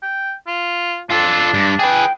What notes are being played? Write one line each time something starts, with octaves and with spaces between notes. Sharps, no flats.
G5
F4
D4 F4 A4
G2
G#4 B4 G5